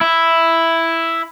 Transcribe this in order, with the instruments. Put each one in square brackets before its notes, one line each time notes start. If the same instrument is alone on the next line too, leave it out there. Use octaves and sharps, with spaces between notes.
[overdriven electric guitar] E4